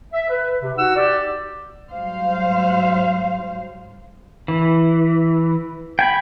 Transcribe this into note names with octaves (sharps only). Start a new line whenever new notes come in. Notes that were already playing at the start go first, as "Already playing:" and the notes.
E5
B4
C3
D#4 F#4 F#5 E6
G4 D5
G#2 F#3 G3 C5 F5
E3
G5 G#5 B5